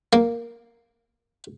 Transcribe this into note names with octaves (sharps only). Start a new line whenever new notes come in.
A#3